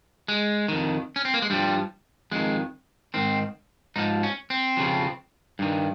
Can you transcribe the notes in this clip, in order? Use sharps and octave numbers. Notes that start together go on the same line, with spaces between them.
G#3
F2 D#3
C#4
C4
A#3
G#3
G2 F3 G3
F2 D#3 G#3
G#2 D#3 C4
G#2 F3 D#4
C#4
C4
F2 C#3 F3
G2 D#3